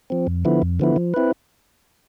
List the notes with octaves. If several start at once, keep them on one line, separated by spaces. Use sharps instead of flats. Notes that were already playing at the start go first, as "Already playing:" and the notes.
F3 C4
F2
D3 F3 B3 E4
F2
D3 F3 B3 E4
F3
C4 E4 B4